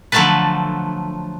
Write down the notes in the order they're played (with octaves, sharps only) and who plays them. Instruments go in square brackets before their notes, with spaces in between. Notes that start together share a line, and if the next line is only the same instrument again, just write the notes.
[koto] D3 F3 F#3 A3 A4 B4